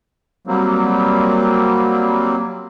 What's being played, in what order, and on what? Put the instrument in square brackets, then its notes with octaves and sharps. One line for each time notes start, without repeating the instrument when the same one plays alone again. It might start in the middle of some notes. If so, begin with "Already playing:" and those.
[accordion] F#3 G3 A#3 C4